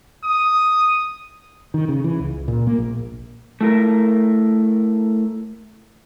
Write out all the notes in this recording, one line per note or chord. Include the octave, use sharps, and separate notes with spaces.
D#6
D#3
C#3
E3
C#2
A#2
A#3
A#1
A3 E4 A#4